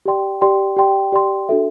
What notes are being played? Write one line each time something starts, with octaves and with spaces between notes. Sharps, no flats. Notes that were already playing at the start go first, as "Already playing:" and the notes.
G4 D5 G5 C6
G4 D5 G5 C6
G4 D5 G5 C6
G4 D5 G5 C6
D4 F#4 A4 E5